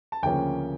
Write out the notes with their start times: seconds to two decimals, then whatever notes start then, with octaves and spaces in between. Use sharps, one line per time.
0.12 A5
0.23 D2 C#3 F3 A#3 C#4 G5